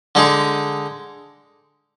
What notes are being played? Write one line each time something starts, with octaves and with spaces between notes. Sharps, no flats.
D3 G#3 D#4 G#4